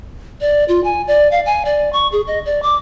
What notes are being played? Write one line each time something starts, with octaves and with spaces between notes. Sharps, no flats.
D5
F4
G#5
D5
F5
G#5
D5
C#6
G#4
D#5
D5
D6